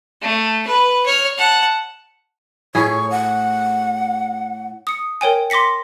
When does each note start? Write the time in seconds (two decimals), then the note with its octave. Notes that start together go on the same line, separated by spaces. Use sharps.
0.22 A3
0.67 B4
1.06 C#5 F6
1.38 F#5 A5
2.75 A2 G#4 C#5
3.10 F#5
4.87 D#6 C#7
5.21 A#4 C#5 G5 G#5
5.50 C6 D6 A#6 B6 C#7